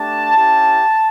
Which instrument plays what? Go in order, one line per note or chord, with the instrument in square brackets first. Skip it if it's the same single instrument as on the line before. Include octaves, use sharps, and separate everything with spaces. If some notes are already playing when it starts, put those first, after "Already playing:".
Already playing: [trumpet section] A3 D4 G4 A5
C#4 E4 G4